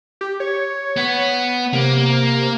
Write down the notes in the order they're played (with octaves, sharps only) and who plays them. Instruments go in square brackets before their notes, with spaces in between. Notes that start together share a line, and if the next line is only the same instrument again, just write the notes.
[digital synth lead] G4
C#5
[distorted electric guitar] B3
[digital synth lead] C3 [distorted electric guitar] A#3